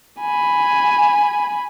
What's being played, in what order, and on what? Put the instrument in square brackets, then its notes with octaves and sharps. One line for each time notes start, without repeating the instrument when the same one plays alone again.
[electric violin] G#5 B5